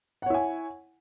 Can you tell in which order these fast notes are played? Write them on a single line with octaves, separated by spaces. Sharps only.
F#5 C#5 E4 G#5